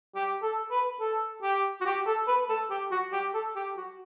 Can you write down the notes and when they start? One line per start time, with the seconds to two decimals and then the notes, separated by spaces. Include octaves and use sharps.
0.15 G4
0.43 A4
0.71 B4
1.01 A4
1.43 G4
1.81 F#4
1.86 G4
2.07 A4
2.28 B4
2.49 A4
2.70 G4
2.91 F#4
3.13 G4
3.35 A4
3.56 G4
3.77 F#4